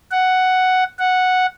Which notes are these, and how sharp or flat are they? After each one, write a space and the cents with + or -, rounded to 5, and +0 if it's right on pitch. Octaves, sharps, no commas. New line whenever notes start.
F#5 +5
F#5 -5